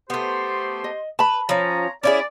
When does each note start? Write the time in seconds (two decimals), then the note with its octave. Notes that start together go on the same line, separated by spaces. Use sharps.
0.10 A3 B3 G4 C5 C6
0.84 D#5
1.19 B4 A5 B5
1.49 F3 C#4 C#5 A#5
2.03 C#4 E4 G#4 D5